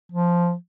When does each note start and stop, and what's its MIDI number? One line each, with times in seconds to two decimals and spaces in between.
0.12 0.53 53